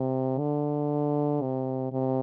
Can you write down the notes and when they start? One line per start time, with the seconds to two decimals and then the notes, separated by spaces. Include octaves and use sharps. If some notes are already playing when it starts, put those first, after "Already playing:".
Already playing: C3
0.39 D3
1.42 C3
1.92 C3